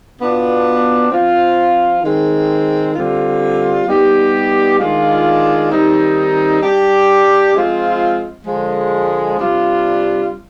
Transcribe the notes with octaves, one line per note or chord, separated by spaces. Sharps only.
B2 B3 D4 F4
F3 C4 F4
D#3 G#3 C4
D3 G3 C4 F4
G3 B3 D#4 G4
D#3 G#3 D4 F4
D#3 G3 C4 D#4
G3 D4 G4
F3 G#3 C4 F4
D3 F3 G#3
C3 G3 D4 F4